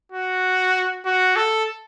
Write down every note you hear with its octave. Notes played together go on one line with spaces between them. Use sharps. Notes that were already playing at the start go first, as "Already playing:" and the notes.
F#4
F#4
A4